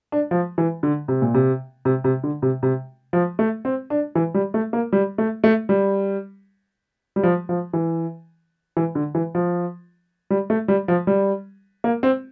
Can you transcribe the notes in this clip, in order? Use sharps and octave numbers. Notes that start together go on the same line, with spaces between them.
D4
F3
E3
D3
C3
A#2
C3
C3
C3
D3
C3
C3
F3
A3
C4
D4
E3
G3
A3
A#3
G3
A3
A3
G3
G3
F3
F3
E3
E3
D3
E3
F3
G3
A3
G3
F3
G3
A#3
C4